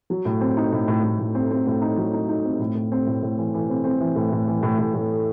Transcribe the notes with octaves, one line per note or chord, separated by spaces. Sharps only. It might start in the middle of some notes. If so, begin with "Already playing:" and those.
F#3
A2
C4
D#4
A2
A2
A2
A2
C4
C4
A2
D#4
F#3
D#4
D#4
C4
A2
A2
C4
A2
A2
E3
E3
C4
C4
E3
A2
A2
E3
A2
A2
A2